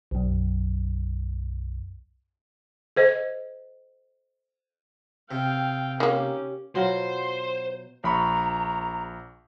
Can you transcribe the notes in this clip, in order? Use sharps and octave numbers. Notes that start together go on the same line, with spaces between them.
B1 F#2
A4 C5 D#5
C3 F5 G5
D#3 A#3 C#4 G4
B2 F#3 F4 C5
A#1 A#5 B5 C#6